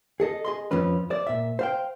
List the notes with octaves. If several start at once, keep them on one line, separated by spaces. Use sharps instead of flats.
G#4 A4 D#5
G#4 D#5 C6
F2 F3 C4 C#4 B4
C5 D5
A#2 E5
C5 F5 G5